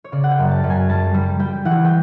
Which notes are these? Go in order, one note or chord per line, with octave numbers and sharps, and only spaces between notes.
C#5
C#3 D5
F#5
G5
F#2
A5
F#2
G#5
G3 A5
G3
G3 G5
E3 F#5
G5